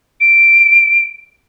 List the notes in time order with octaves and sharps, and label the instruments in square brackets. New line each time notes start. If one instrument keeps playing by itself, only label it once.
[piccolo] D7